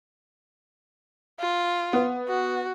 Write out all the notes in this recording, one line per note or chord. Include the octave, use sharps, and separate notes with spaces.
F4
B3
F#4